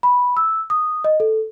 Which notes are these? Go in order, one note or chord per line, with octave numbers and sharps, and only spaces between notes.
B5
E6
D#6
D#5
A4